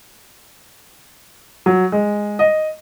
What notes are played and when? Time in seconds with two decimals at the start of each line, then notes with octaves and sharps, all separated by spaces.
1.66 F#3
1.92 G#3
2.39 D#5